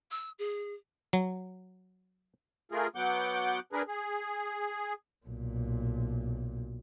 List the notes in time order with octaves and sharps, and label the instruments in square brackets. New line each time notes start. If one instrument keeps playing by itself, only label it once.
[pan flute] E6
G#4
[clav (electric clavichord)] F#3
[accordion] A3 F4 G#4 A#4
F#3 B3 F#5 D6 G6
D4 G#4 A#4 B4
G#4
[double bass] B1 A#2